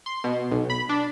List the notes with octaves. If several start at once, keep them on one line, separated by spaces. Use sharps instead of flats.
C6
B2
B1
B5
D4